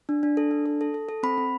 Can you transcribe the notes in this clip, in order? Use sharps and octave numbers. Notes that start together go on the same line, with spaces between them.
D4
D4
A4
D4
A4
A4
A4
A4
C4 B5
C4